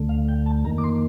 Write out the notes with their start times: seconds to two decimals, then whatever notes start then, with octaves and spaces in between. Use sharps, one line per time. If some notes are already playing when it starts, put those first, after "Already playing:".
Already playing: D2 D3 A3
0.09 F5
0.29 G5
0.46 A5
0.65 F2 D#3 A#3 A#5
0.78 D6
0.84 C6